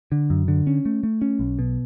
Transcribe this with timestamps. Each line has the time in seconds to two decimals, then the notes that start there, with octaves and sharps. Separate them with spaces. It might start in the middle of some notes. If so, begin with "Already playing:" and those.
0.12 D3
0.30 F#2
0.48 D3
0.67 C#4
0.85 A3
1.03 A3
1.22 C#4
1.39 B1
1.59 B2